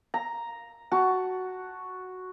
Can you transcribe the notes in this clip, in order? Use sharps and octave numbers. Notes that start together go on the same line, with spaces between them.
A#5
F#4 A5